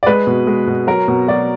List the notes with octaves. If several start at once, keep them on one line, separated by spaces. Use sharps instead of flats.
D5
G#3 B4
B2
G#3
B2
F#3 A#4
B2
F#3 D5